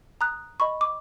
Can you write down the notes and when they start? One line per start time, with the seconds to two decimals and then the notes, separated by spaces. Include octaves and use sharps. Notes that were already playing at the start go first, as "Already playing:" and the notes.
0.21 A#5 D#6 F#6
0.60 D#5 B5 C#6
0.81 D6